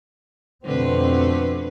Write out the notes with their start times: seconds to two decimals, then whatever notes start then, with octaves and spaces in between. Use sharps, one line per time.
0.64 F2 B2 D3 A3 C4 B4